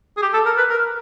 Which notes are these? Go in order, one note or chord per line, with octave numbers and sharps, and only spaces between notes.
G#4
G4
A4
A#4
B4
A#4